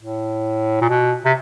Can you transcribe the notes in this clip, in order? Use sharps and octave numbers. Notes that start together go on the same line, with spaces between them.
A2
A#2
B2
C3